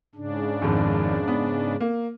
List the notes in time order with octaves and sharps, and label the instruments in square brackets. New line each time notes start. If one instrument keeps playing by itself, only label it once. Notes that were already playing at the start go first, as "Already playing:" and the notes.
[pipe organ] G#2 C#3 D4
[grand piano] G#1 F2
B3
A#3